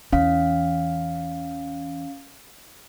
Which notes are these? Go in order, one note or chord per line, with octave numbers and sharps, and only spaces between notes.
E2 E3 C#4 F5